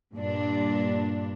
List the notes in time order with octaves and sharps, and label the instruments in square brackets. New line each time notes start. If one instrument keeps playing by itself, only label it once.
[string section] G2 A#2 D4